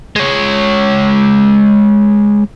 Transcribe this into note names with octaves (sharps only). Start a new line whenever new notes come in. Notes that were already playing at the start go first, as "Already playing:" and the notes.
G#3 C#5